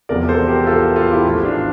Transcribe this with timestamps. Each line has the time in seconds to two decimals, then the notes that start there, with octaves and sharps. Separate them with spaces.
0.09 E1 E2 C3 F3 A#4 D5
0.28 A4 C5
0.48 G4 A#4
0.67 F4 A4
0.96 F4 A4
1.11 E4 G4
1.26 A1 A2 F3
1.45 D4 F4